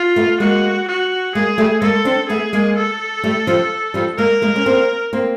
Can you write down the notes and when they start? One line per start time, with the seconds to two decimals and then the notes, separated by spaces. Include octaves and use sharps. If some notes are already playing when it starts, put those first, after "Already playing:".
Already playing: F4
0.16 A3 B3
0.40 G#3 A#3 F#4
0.88 F#4
1.35 G#3 A#3 G#4
1.58 G3 A3
1.82 G#3 A#3 A4
2.05 C4 D4
2.29 A3 B3 G#4
2.53 G#3 A#3
2.77 A4
3.23 G3 A3
3.47 F3 G3
3.94 F3 G3
4.18 G#3 A#3 A#4
4.42 G#3 A#3
4.56 C#4
4.66 A#3 C4
5.13 A#3 C4